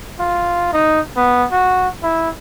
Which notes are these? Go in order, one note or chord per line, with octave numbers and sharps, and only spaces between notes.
F4
D#4
B3
F#4
E4